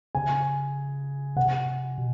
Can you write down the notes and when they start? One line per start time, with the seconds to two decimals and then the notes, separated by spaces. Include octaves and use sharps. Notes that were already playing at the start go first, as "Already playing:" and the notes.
0.15 C#3 G#5
1.36 C3 F#5
1.98 B2